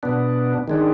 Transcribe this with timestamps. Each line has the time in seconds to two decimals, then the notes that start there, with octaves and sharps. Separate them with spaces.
0.03 B2 B3 D4
0.68 D#3 G#3 D4